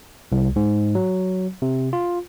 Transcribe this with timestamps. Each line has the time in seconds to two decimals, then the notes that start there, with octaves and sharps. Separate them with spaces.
0.32 C2
0.56 G#2
0.95 F#3
1.62 C3
1.93 F4